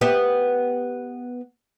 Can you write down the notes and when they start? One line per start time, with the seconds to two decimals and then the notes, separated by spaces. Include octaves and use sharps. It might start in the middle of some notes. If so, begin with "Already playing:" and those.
0.01 B3 G4 E5